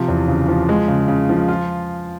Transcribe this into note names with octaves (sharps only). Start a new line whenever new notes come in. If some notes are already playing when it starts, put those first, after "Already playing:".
Already playing: C3 F3
E2
C#3
F3
G#3
C#3
C#3
F3
F4